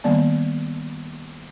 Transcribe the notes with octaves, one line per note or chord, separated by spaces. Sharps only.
D#3 G3 A#3 B3 D5 A5